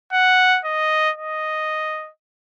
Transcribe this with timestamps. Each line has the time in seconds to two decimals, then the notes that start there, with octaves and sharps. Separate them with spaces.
0.13 F#5
0.65 D#5
1.17 D#5